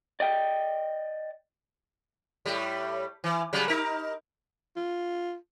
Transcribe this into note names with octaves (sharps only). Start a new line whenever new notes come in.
D5 D#5 G5
A2 G3
E3
C#3 F#3 G3
D#4 A#4
F4